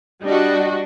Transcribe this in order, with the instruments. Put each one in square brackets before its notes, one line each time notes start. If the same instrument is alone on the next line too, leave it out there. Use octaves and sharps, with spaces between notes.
[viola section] G3 F#4 [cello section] D4 D#5